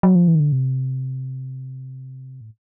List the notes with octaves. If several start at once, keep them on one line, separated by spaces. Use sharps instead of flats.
F#3
F3
E3
D#3
D3
C3
A2